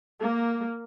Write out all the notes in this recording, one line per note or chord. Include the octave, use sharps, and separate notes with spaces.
A#3